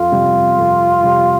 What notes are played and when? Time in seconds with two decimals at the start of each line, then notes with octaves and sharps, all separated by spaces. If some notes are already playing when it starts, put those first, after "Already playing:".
Already playing: F2 F4
0.12 C3 G3 C4 G4
0.58 F2
1.03 C3 G3 C4 G4